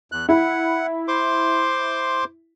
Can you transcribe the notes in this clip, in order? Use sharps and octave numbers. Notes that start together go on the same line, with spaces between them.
E2 F#6
E4 F#5
C5 C6 D6